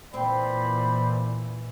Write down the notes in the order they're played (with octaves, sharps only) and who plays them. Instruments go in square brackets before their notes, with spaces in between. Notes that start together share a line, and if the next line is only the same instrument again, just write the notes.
[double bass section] A#2 E3 [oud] C4 [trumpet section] C5 D5 B5